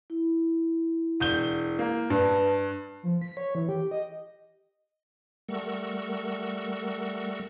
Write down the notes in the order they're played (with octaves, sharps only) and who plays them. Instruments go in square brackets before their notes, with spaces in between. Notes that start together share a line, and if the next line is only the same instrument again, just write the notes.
[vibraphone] E4
[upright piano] E1 G6 G7
A#3
[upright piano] G2 [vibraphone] B4 A5
[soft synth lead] F3
B6
C#5
E3
G4
D#5
[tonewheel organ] G3 A3 A#4 F#5 C#6 E6